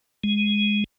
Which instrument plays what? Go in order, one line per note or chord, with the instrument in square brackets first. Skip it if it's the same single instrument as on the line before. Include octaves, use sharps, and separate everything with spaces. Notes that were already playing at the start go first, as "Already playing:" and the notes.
[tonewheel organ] G#3